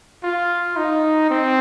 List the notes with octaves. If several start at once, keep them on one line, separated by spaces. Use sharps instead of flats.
F4
D#4
C4